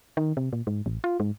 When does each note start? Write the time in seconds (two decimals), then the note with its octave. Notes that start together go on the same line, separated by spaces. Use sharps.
0.17 D#3
0.37 C3
0.53 A#2
0.67 G#2
0.86 A1
1.04 F4
1.20 G#2